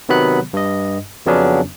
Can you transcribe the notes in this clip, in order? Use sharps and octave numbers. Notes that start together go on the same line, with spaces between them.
C3 D#3 F#3 B3 B5 F#6
G2 D#5
F2 C#3 F#3 B3 C#4 D4